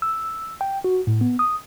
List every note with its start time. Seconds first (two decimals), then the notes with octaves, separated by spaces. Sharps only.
0.02 E6
0.61 G5
0.84 F#4
1.07 A2
1.21 B3
1.39 D#6